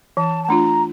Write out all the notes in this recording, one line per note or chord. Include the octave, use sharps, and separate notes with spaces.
E3 A5
A5
A3 D4 F4 A#5